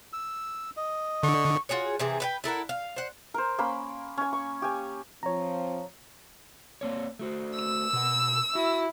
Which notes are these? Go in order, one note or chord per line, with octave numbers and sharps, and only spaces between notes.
E6
D#5
D3 C#6
F4 F#4 G#4 C#5
C3 E3 G#4
B4 F#5 G5
E4 A4 A#4 F#5
F5
C5 F#5
A#4 C5
A#3 C#4 B5 C6
C#4 G#5
C#6
G4 G#5
F3 C4 C#5 A#5
A#3 C4 C#5
A3 F#4 C5
E6
B2 F#5
E4 F#4